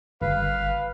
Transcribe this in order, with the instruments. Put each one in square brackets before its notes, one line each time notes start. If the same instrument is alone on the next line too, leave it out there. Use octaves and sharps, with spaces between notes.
[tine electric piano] G1 [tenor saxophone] B4 [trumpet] F5